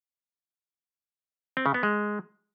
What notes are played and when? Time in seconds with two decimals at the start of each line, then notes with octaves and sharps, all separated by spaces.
1.57 C4
1.66 C#3
1.74 B3
1.83 G#3